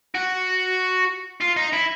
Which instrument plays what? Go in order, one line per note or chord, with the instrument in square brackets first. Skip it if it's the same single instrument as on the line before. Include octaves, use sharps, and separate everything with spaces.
[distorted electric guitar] F#4
F4
D#4
E4